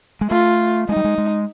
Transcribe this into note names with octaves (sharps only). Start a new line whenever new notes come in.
G#3
A3 F4
G#3 D#4
G3
G#3
G#3